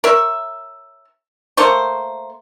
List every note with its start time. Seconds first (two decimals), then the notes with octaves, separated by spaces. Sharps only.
0.04 A#4 C#5 E5
1.57 A3 A#3 C5 C#6